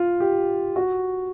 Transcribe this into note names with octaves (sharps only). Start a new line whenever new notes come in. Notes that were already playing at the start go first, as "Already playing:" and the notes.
Already playing: F4
G4
F#4